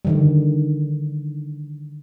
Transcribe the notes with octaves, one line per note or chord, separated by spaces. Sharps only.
D3 D#3 G3